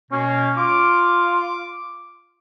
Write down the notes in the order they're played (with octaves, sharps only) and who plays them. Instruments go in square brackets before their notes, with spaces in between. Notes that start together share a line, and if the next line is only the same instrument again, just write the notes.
[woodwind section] B2 A#3 [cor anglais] C#4
[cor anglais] F4 [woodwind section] D6